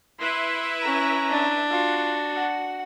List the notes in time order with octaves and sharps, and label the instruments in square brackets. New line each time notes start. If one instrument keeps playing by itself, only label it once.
[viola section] E4 B4 E5 [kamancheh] C6
[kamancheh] C#4 A#5
[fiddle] D4
[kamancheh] F4 [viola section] F#4
[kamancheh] F#5